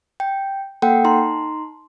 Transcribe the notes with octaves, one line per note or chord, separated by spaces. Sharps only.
G5
A#3 A4 F#5 G5
D#4 A#5 C6